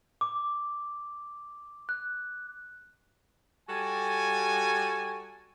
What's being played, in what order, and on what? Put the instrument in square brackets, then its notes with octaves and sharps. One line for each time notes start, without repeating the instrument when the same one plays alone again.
[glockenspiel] D6
F#6
[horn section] G3 F#4 A4 G#5